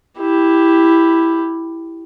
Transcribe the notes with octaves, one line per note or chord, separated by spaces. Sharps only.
E4 G4